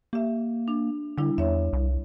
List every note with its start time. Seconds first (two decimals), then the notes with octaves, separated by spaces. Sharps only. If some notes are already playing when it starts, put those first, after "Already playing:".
0.13 A#3 G4 E5
0.68 D4
1.18 D3 G3 D4 E4
1.38 E2 C#5 E5
1.73 C2